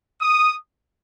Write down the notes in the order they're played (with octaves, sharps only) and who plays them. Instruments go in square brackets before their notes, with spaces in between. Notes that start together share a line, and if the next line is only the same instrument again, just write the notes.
[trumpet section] D#6